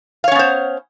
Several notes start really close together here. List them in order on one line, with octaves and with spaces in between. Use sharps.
F5 C#5 C#4 B3 C5